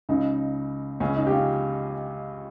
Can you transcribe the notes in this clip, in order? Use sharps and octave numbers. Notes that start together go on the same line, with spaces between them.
C#2 C#3 D#4
C#2 C#3 C#4
D#4
G4
C#4 F4